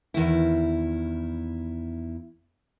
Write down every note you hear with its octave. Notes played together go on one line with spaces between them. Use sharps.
E2 D#3 E4